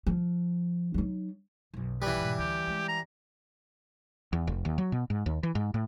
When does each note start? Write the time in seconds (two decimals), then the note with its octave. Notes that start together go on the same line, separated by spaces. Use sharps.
0.07 F3
0.94 F#3 D#4
1.74 B1 F#2
2.02 E3 G3 B4
2.18 G#2 B2
2.38 D2 G4
2.67 G#3 C#4
2.88 A#5
4.33 E2
4.47 F1
4.65 D#2
4.78 F#3
4.92 B2
5.10 G#2
5.26 D#2
5.43 E3
5.55 G#2
5.74 A2